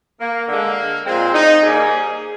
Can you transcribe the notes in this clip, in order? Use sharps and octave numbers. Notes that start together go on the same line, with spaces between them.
A#3
D3 G#3 A#3
A#2 F3 G#3 C4
D#4
C3 G3 A#3 G#4